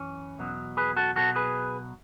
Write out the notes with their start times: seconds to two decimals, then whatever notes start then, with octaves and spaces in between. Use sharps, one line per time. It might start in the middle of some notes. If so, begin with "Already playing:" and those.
Already playing: F#2 E3 C#4
0.38 E2 B2 F#3
0.77 G#4 B4
0.96 F#4 A4
1.16 B1 B2 F#3 F#4 A4
1.36 G#4 B4